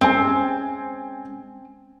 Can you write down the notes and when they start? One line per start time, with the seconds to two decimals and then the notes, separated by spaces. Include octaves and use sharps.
0.01 G#3 C4 C#4 G5 G#5